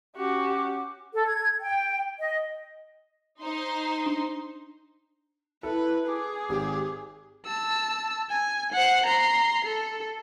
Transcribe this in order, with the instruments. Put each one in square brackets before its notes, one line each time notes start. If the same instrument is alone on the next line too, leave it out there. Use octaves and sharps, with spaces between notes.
[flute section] C#4 D6 [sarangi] F#4 [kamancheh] G4
[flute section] A4
G#6
G5
D#5
[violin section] D#4 C5 C6
[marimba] D4
[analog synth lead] E4 [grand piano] A4 [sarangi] B4
[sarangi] G#4 [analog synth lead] D6
[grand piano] G#1 [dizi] G4
[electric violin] A5 E6
G#5
C5 F#5
A#5 C6
A4